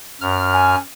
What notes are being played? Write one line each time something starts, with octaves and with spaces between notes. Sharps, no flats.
F#2 F6
G#5